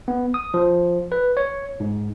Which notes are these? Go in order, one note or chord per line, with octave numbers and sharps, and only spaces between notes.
B3
D#6
F3
B4
C#5
G#2